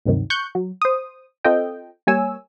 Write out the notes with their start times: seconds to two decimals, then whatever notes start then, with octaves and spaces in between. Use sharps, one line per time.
0.05 D2 G2 C3 D#3 F#3
0.30 C#6 F#6 G6
0.55 F#3
0.82 C5 D#6
1.44 C4 F4 A4 D#5 G5
2.07 G3 A#3 C#5 G#5 E6